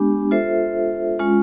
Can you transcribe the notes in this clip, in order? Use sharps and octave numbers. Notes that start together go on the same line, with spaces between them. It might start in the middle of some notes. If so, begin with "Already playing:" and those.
Already playing: G#3 B3 D4 G4
F4 A4 C5 E5
G#3 C#4 F4